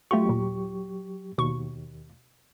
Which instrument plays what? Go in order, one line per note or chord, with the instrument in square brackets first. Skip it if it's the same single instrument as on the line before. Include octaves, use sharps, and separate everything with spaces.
[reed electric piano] F#3 G4 C#6 [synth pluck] A3 F4
[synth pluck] D#2 A#2
[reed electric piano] D#2 [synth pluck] B2 C#6